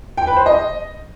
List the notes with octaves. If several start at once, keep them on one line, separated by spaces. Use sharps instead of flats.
G5
B4
C5
D#5